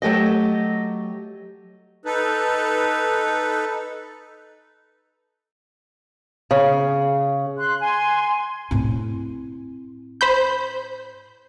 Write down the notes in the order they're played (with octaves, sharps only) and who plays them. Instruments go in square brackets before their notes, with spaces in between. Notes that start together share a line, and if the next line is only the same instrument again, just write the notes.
[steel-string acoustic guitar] F#3 A3 G4 D#5
[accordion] D#4 A4 B4
[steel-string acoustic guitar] C#3
[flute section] C6 F#6
G#5 C6
[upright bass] A2 C4
[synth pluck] C5 B5 G6